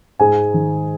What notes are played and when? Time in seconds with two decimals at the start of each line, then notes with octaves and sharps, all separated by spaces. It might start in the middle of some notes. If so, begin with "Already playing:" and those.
0.20 G#2 G#4 G#5
0.54 D#3